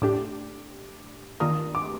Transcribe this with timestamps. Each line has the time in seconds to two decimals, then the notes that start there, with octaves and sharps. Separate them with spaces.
0.02 A2 A3 D4 G4 D6
1.40 D#3 A#3 D4 F4 A#4 D#6
1.75 D6